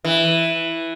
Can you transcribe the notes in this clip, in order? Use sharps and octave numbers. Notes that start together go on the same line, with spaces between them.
E3